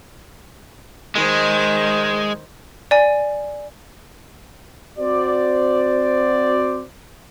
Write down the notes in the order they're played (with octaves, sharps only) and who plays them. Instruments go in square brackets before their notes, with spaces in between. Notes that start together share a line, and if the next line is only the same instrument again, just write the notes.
[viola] D#3 C5 [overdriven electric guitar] G#3
[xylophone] D5 G#5
[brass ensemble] C4 F#4 C5 D5